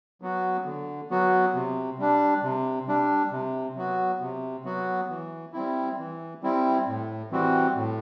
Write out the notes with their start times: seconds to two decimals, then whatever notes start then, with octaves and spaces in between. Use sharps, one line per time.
0.22 F#3 B3 F#4
0.66 D3
1.10 F#3 B3 F#4
1.55 C3
1.99 G3 D4
2.43 C3
2.88 G3 D4
3.32 C3
3.76 F#3 B3 F#4
4.21 C3
4.65 F#3 B3 F#4
5.10 E3
5.53 G3 C4 E4
5.98 E3
6.42 G3 C4 E4
6.87 A2
7.31 E3 G3 C4 F#4
7.75 A2